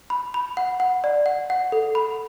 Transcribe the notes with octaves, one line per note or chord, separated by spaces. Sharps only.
B5
B5
F#5
F#5
D5
F#5
F#5
A4
B5